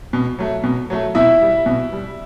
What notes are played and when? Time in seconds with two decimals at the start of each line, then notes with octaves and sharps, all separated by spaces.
0.13 B2
0.39 F#3 A3
0.64 B2
0.90 F#3 A3
1.15 B2 E4 E5
1.41 G3
1.66 B2
1.92 G3